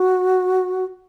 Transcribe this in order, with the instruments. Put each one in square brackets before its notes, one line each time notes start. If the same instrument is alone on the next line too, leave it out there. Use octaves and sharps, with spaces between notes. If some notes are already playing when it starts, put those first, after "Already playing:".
Already playing: [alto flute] F#4